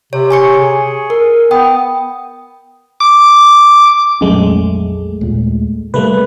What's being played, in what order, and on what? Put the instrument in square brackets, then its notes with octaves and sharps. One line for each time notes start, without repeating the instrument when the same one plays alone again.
[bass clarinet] C3 [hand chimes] C#5
[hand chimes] G#5 C#6 C#7
[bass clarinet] G#4
[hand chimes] A#4
[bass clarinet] B3 [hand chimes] G5 D#6
[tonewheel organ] D6
[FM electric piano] A#1 G#3 A3 [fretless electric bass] F2 F#3 C#4
[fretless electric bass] D#2 A#2
[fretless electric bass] C3 G3 [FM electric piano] A3 A#3 B4